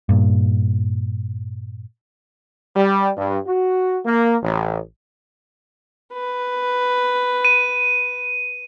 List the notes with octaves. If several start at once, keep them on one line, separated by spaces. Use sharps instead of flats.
G2 A#2
G3
G2
F#4
A#3
A1
B4
D#7